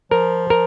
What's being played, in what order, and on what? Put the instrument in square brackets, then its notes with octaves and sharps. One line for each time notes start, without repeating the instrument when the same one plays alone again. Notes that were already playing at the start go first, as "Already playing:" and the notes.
[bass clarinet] F3 [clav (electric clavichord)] A#4
[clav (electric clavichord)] A#4